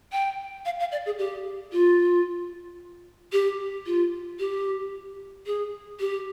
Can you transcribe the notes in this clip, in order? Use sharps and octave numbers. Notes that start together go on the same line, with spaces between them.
G5
F5
F5
D5
G#4
G4
F4
G4
F4
G4
G#4
G4